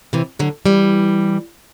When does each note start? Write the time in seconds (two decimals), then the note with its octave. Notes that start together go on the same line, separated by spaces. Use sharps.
0.13 C3 E3
0.39 D3 F#3
0.66 E3 G3